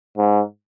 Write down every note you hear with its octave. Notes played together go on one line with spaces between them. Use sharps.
G#2